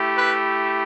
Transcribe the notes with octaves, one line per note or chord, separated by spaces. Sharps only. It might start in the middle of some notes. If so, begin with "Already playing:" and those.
Already playing: A3 E4 G4
B4